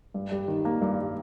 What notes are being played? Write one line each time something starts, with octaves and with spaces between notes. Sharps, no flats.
G2
G3
D#3
A#3
G2
G3